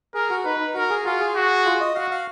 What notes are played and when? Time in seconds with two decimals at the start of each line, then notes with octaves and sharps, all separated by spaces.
0.14 G#4 A#4
0.30 F#4
0.45 D#4 B4
0.60 D#4
0.74 F#4 A#4
0.90 G#4
1.05 F4 F#4
1.20 G#4
1.35 F#4
1.66 F4
1.81 D#5
1.95 F#4 F5
2.11 F5